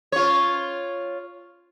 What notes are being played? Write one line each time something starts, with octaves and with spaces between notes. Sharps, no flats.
F4 C#5